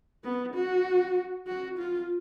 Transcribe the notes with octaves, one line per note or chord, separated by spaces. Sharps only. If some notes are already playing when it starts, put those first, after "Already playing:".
B3
F#4
F#4
F4